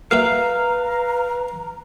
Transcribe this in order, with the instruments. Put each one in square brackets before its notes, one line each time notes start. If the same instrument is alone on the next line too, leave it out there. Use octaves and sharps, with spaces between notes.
[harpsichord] A#3 F#4 E5 [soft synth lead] B4 [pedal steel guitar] F5 [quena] A#5